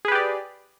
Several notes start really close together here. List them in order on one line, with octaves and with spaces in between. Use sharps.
G#4 B4 G4 D5